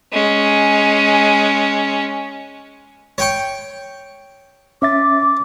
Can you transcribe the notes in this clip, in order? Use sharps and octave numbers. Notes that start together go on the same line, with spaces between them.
G#3 C#4
C#5 G5 C#6
C#4 E5 D6 A6